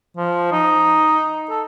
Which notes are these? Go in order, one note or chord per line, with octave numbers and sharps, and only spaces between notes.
F3
D#4
A4